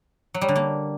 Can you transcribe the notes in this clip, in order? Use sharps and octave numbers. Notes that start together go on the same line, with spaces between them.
F#3
G3
D3
A#3